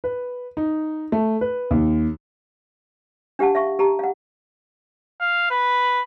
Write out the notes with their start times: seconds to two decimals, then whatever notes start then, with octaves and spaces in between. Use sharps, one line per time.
0.04 B4
0.57 D#4
1.12 A3
1.41 B4
1.71 D#2
3.39 D4 G4 F5 F#5 A5
3.55 E5 F5 C#6
3.79 G4 A5 A#5
3.99 F5 F#5
5.21 F5
5.51 B4